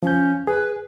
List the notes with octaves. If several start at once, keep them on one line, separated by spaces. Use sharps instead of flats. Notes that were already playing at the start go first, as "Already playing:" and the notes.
F3 C#4 G6
G#4 B4